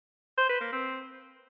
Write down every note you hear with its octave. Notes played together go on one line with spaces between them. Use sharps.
C5
B4
A#3
C4